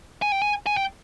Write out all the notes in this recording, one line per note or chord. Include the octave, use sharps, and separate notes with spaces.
G#5
G5
G#5
G#5
G5